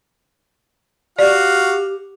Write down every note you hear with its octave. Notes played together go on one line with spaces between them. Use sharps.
F#4 G4 D5 F5